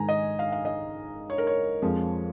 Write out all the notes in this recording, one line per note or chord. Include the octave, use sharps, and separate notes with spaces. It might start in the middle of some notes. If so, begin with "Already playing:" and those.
Already playing: G#2 D#3 G#3 G#5 A#5
D#5
F5
F5
D#5
C#5
A#4
C#5
F2 F3 G#3